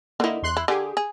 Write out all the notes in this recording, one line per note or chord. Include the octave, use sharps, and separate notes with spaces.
D3 A#3 D#4 E4
E2 C6 F#6
E4
D3 G4 G#4
G#4